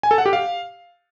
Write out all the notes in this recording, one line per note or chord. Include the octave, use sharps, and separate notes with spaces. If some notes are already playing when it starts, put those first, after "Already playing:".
G#5
A4
F#5
G4
F5